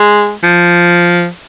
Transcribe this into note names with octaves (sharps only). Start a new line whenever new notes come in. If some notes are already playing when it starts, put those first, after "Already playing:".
Already playing: G#3
F3